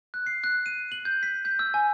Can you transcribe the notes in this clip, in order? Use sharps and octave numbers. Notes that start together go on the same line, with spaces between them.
F#6
C7
F#6
D#7
F#7
G6
B6
G6
E6
G#5